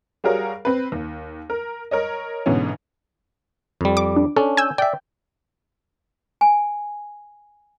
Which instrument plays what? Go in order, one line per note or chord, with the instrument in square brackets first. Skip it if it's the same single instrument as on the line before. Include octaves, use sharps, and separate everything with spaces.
[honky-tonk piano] G3 F#4 G#4 A#4 C#5 F5
C4 B4
D#2
A#4
A#4 C#5 D#5
G#2 B2 D3 E3 C#4
[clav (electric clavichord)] F2 G3
[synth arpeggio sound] D6
D4
[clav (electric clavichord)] C#4 D4 [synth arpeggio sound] A4
[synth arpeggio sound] G#5 E6 G6
[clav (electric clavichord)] D5 E5 [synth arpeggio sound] G5
[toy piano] G#5